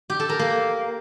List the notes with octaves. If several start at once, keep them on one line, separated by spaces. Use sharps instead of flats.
G4
A4
A#4
A#3